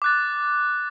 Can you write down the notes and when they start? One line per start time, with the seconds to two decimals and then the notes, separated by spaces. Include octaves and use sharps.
0.02 D6 F#6 A6